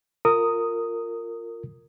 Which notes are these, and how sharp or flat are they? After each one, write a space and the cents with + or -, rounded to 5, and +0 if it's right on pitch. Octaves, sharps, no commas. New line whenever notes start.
F4 +0 A#4 -20 D#6 +0